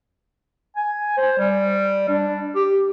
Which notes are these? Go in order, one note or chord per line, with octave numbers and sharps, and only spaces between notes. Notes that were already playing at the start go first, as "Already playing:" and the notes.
G#5
C5
G3
D4
G4